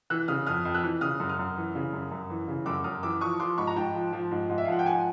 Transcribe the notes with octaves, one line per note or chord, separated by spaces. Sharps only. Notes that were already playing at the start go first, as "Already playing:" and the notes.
E3 E6 F#6
C#3 D#6 F6
F2 D#6 F6
F2
E6 F#6
E3
C#3 D#6 F6
F#2
D#6 F6
F#2
E3
C#3
F#2
F#2
E3
C#3
F#2 D6 E6
F#2 D#6 F6
E3 D6 E6
F3 C#6 D#6
F3 C6 D6
G#2 B5 C#6
A#5
G#2 G5 A5
F3
F3
G#2
G#2
E5
F5
F3 F#5
G5
F3 F#5 G#5